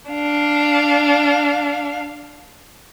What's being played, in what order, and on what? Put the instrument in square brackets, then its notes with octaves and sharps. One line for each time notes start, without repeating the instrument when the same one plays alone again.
[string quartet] D4 F5